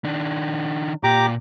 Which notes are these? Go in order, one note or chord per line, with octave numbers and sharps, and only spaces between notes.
D#3 D4
A#2 G4 A#5 D6